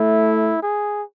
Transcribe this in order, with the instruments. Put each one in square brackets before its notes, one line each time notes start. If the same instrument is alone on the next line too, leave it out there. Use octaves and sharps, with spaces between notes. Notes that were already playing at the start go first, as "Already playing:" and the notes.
Already playing: [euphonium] A3 [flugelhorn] E4
[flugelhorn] G#4